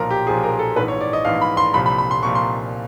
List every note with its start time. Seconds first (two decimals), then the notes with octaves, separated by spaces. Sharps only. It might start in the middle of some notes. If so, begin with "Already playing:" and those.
Already playing: B1 A#2 F3 A#4
0.11 G4
0.27 B1 A#2 F3 G#4
0.43 A#4
0.59 A4
0.76 A#1 G#2 E3 B4
0.88 C#5
1.01 D5
1.13 D#5
1.25 A#1 G#2 E3 F5
1.41 B5
1.57 C6
1.74 C2 A#2 F3 B5
1.86 B5
1.98 B5
2.11 C6
2.23 C2 A#2 F3 C#6
2.35 C6